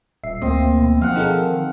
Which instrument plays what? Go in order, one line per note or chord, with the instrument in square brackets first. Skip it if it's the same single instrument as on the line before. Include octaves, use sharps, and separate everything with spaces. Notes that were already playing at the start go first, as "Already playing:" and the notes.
[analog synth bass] D#1 [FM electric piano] E5 C7
[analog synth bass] D2 [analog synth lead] A#3 [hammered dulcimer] C4 D#5
[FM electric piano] B2
[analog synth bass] F3 [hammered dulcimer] F5 F#5
[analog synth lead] D#3 [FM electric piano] D#4 G#4 A4